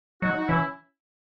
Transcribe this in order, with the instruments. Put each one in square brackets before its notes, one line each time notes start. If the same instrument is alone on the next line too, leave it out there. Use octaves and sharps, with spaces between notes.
[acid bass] F#3 [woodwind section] D#4 F#4
[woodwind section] D#4 F#4
[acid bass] E3 [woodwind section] C#4 E4